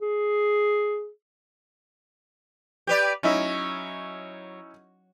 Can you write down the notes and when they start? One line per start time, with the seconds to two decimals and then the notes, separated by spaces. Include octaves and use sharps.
0.02 G#4
2.87 G4 B4 D5
3.23 F#3 C#4 D#4 E4